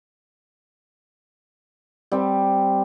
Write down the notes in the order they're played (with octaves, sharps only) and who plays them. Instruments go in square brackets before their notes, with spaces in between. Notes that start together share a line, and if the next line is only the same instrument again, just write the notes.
[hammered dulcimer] G3 C4